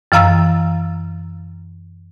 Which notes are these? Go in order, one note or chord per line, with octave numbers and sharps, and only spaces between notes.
F#2 E3 F5 A#5 E6 A6